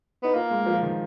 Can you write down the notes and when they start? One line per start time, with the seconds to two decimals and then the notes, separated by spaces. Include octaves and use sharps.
0.23 B3 D#4
0.34 A#3 F4
0.51 G#3
0.66 F3
0.83 D#3